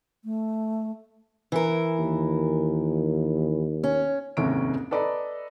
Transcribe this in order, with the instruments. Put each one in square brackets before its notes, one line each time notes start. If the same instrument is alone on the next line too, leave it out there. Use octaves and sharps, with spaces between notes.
[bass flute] A3
[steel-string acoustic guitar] E3 A#4
[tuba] D#2
[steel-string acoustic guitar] C#4
[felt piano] F1 D#2 G#2 C3 C#4 D7
A4 B4 D5 D#5 A#5 B5